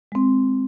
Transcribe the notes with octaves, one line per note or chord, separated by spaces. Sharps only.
G#3 C4